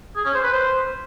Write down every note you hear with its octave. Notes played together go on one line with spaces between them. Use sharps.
G#4
C#4
C5
B4
C5